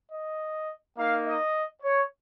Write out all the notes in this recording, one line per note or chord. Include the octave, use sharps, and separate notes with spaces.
D#5
A#3 D#4 F5
D#5
C#5